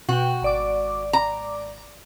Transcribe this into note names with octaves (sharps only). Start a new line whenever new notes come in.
B2 F#4 G5
G#1 D5 D6
A#5